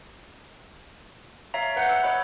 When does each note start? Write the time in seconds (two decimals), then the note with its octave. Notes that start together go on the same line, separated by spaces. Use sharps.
1.54 C#5 E5 F5 A#5
1.76 B4 F#5 G6 C#7
1.89 E6
2.03 C#5 D#5 B5